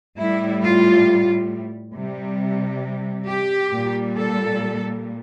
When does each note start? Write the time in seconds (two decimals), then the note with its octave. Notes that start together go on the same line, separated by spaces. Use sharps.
0.18 A2 G3 E4
0.63 F4
1.95 C3 G3
3.28 G4
3.73 A#2 G3
4.17 A4